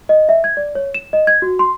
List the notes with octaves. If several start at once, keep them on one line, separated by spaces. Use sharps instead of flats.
D#5
E5
G#6
D5
C#5
E7
D#5
G#6
F#4
C6